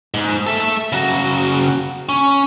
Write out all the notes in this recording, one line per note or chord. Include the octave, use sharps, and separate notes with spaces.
G#2
A4 E5
C#3 F#4
C#4